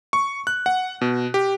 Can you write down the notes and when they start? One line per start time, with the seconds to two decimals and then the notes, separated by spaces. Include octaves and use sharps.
0.13 C#6
0.47 F#6
0.66 F#5
1.01 B2
1.34 G4